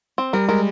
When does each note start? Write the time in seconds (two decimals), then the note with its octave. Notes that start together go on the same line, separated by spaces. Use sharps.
0.18 C4
0.33 G3 A#4
0.49 G#3 A#4